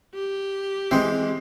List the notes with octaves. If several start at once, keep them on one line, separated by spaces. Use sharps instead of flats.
G4
E3 G#3 C4